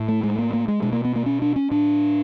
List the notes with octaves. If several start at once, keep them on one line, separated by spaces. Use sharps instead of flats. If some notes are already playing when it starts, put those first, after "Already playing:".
Already playing: A2
A3
G#3
A#3
A#3
G#3
B2 G#3
A#3
B3
A#3
C#4
D4
C#4
A2 D4